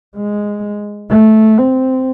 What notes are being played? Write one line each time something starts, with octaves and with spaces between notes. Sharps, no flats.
G#3
A3
C4